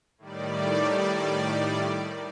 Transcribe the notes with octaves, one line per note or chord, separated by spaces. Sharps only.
A2 D#3 G3 D5